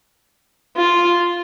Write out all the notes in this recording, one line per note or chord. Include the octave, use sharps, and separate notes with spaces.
F4